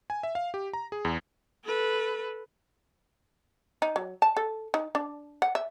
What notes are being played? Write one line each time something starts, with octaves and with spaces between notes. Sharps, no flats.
G#5
E5
F5
G4
A#5
G#4
E2
A4 B4
D#4
F#3
A5
A4
D#4
D4
F#5
E5